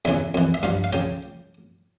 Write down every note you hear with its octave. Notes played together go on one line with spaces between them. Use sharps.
E2 C#3 E3 E5
F2 E3
E5
G2 F3 F5
F5
C#3 F3 G5